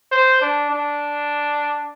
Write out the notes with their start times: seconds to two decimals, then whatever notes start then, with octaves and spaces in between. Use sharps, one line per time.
0.12 C5
0.42 D4
0.70 D4